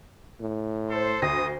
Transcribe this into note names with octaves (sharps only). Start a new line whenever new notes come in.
A2
A4 C5
D2 D#6 A#6